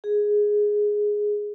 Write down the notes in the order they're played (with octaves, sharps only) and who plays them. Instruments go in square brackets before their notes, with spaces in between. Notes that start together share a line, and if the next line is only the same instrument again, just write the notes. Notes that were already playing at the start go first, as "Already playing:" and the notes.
[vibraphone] G#4